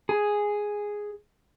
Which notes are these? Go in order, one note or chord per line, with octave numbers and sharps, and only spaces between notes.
G#4